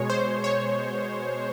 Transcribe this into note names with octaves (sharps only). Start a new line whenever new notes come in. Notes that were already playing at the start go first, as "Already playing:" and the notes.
Already playing: B2 G#3 C#5
C5
C#5